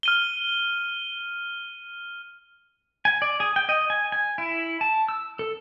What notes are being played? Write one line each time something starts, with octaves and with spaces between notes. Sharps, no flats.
F6 D#7 G7
G#5
D5
G#4
G5
D#5
G#5
G#5
E4
A5
E6
A4